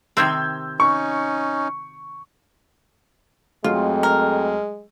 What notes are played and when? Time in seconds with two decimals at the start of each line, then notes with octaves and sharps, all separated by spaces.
0.17 C3 D#3 C4 E6 G6 G#6
0.80 C#4 D#4 C#6
3.64 F2 F#3 G#3 A3 F4
4.03 A#4